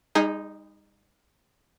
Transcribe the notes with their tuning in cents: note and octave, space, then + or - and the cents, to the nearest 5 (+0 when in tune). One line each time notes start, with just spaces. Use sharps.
G3 +45 D#4 +0 G#4 +0